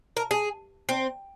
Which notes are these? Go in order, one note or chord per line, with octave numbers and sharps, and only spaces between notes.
A#4
G#4
C4